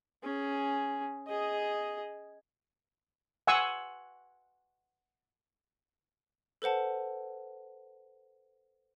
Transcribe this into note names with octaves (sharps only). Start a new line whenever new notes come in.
C#4 G#4
G#4 D#5
F#5 G#5 C6 C#6 E6
A4 B4 C5 F#5 A5